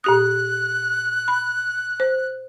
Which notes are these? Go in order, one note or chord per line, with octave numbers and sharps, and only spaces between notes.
A#2 G4 D#6 F#6
B5
C5